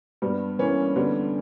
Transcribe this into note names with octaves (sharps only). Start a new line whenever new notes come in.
G2 G3 B3
E3 A#3 C#4
D3 G3 B3